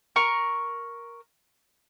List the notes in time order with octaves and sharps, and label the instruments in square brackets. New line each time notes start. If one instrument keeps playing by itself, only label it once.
[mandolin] A#4 C#6